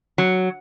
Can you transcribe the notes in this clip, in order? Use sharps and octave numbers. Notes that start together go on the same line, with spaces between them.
F#3